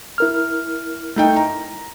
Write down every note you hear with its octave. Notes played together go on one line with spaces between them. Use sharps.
E4 A#4 F6
A3 D#4 G5
A#5